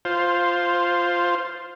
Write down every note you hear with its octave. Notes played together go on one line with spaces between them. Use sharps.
F4 C5